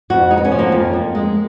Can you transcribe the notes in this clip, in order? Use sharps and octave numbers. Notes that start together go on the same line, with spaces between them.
F2 F#4
G#3 D#4
B3
C#4
F3
A#3
F2
F2
G#3